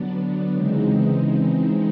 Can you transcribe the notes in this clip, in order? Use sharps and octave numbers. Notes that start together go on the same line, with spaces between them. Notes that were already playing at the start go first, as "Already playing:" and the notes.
Already playing: D3 F#3 B3 D4
C#3 E3 G#3 C4 D#4